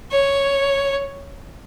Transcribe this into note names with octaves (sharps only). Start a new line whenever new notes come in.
C#5